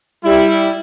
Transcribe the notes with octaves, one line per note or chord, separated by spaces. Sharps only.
G3 E4